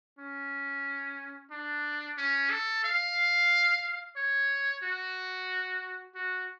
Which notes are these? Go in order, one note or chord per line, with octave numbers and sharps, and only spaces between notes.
C#4
D4
C#4
A4
F5
C#5
F#4
F#4